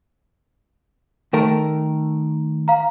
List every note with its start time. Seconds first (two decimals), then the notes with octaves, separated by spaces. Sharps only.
1.33 D#3 A3 A#4
2.68 F5 A#5